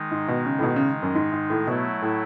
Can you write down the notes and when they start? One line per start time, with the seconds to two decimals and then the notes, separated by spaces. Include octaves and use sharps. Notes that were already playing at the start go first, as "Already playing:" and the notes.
Already playing: D#3 G#3 D#4
0.11 G#2
0.28 B2
0.46 C#3
0.59 A2
0.63 B2
0.76 C#3
1.03 F#2
1.15 G#2
1.32 G#2
1.50 A2
1.67 B2 F#3 A3 E4
2.02 A2